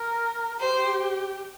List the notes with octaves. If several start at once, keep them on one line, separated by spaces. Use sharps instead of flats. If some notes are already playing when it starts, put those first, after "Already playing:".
Already playing: A#4
G4 C5